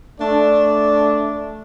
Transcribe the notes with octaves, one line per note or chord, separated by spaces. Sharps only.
A3 D4